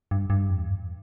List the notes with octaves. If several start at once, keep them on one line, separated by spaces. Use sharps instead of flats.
G2
G2
F2
E2
G2